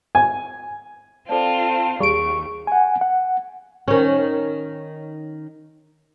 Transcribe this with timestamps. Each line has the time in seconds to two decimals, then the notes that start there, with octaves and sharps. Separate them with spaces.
0.15 G#5
1.29 C4 F4 A4 C5 D5 A5
2.00 D#2 G3 G#4 C#6 D7
2.67 F#5 G#5
3.01 F#5
3.88 D#3 C#4